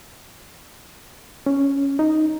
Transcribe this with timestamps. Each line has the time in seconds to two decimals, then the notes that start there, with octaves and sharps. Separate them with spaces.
1.46 C#4
1.99 D#4